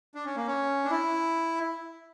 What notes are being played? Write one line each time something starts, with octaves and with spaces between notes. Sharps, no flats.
D4
C#4
A#3
C#4
D4
E4